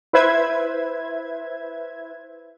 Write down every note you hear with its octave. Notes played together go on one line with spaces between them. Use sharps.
E4 B4 C5 E5 G#6